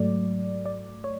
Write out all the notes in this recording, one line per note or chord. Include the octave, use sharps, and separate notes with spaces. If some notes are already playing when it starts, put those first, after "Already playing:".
Already playing: G#2 F#3 A3 D5
D5
C#5